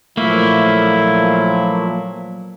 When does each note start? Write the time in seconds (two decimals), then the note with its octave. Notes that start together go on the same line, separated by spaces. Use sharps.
0.17 A#2 F3 F#3 A3 A#3 E4